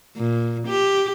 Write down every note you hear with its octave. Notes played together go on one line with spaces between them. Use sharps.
A#2
G4